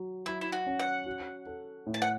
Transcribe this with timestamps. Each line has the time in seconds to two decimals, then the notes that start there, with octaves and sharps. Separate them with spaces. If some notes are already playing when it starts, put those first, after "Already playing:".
Already playing: F#3
0.26 F#3 E4
0.41 E4
0.52 F#4
0.66 C#4
0.79 F#5
1.06 F#4
1.47 A4
1.87 A2
1.94 A5
2.02 F#5